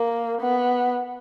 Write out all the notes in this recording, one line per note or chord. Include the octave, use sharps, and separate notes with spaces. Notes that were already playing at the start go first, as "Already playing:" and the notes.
Already playing: A#3
B3